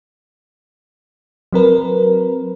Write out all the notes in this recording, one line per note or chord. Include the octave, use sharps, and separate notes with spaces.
F#3 C4 A#4 B4